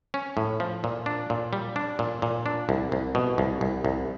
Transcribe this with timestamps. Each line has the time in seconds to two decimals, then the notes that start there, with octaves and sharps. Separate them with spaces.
0.14 C#4
0.37 A2
0.60 F3
0.84 A#2
1.06 D4
1.30 A#2
1.53 G3
1.76 D4
1.99 A#2
2.22 A#2
2.46 D4
2.69 C2
2.92 C2
3.15 B2
3.38 C2
3.61 C2
3.85 C2